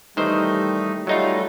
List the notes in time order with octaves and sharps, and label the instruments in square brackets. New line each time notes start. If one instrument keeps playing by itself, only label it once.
[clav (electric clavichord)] D#3 E3 C5 [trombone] G3 [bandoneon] A3 D#4
[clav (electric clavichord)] F#3 D#4 F4 [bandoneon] G3 A3